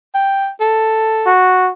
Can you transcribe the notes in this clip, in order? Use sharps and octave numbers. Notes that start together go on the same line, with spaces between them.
G5
A4
F#4